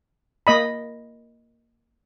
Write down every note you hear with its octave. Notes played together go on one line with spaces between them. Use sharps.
A#3 D#5 B5